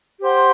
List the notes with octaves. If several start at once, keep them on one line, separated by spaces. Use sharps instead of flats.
G4 C5 F#5 C6